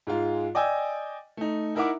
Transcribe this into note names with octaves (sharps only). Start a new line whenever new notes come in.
G#2 G#3 F4
D5 D#5 G5 G#5 E6
A3 D#4
D#4 E4 A#4 E5 F#5 D6